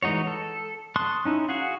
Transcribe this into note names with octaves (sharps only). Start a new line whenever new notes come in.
E3 G#3 D#4 F#4 C#5
A4
A5 C6 C#6 D#6 F#6
C#4 D#4 E4
F#4 G#4 F5 F#5